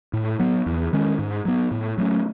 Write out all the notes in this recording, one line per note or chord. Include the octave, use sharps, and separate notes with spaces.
A2
F#3 B3
E2
D#3 G#3 C#4
G#2
F#3 B3
A2
F#3 A3 C#4